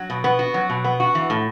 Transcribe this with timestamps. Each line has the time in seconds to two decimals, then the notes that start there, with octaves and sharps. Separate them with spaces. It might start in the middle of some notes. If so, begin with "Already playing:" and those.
Already playing: F#3
0.10 B2
0.24 B3
0.39 F#4
0.54 F#3
0.70 B2
0.84 B3
1.00 F#4
1.15 E3
1.30 A2